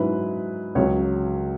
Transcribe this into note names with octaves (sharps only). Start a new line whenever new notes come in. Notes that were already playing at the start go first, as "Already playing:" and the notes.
Already playing: G#2 F#3 C#4 E4 B4
C#2 C#3 F#3 C#5